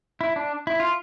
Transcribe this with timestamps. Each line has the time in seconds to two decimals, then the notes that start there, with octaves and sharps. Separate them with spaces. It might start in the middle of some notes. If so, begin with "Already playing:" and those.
0.21 E4
0.36 D4
0.67 E4
0.80 F4